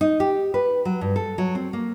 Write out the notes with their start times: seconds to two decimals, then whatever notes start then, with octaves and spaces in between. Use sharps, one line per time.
0.01 D#4
0.20 G4
0.54 B4
0.85 F#3
1.01 G2
1.16 A4
1.38 F#3
1.55 C4
1.73 A#3